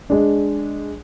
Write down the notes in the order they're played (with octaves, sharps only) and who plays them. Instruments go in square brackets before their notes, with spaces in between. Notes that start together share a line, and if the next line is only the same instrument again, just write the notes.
[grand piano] G#3 D4